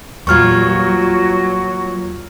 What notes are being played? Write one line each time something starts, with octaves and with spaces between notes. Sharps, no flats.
E2 A#2 F#3 G3 F4 C#6 F6 G#6